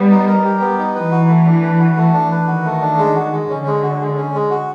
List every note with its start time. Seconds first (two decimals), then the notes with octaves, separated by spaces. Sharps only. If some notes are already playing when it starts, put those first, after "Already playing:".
Already playing: G3 B3
0.11 D#4
0.27 A#4
0.44 G4
0.61 B3
0.79 D#4
0.95 E3 B4
1.11 F#4
1.29 A3
1.45 D4
1.62 B4
1.79 F#4
1.97 A3
2.13 D4
2.31 B4
2.47 D#3 F#4
2.64 A3
2.81 D4
2.98 G#3
3.15 F#4
3.32 G#3
3.50 D3 C#4
3.66 G#3
3.83 F#4
4.00 G#3
4.17 C#4
4.34 G#3
4.51 F#4